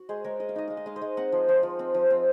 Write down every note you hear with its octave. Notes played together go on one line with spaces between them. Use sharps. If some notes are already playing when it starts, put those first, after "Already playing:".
Already playing: F#4
G#3 G#4 C5
G#3 A#4 C#5
G#3 D#5
F5
D#4 D#5
G#3 F5
D#5
G#3 F5
C5 D#5
G#3
C4 F#5 A#5
F3
F3
F3
C4
F3
C4